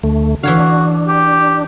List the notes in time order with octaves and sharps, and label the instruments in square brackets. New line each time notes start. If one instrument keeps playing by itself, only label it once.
[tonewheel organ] D2 A3
[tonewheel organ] D3 [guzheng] E3 C#5 F5 [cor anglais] F#4
[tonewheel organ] D4
[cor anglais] G4